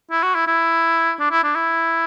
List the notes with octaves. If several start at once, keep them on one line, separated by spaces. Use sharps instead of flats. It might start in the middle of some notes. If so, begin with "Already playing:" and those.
E4
F#4
E4
E4
D4
E4
D4
E4